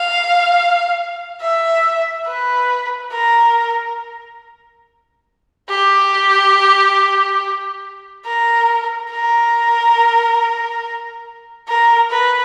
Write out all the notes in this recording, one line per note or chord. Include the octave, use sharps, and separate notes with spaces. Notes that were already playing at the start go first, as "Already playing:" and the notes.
Already playing: F5
E5
B4
A#4
G4
A#4
A#4
A#4
B4